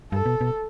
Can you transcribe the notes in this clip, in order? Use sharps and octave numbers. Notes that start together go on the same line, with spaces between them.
G2 A4
B2
B2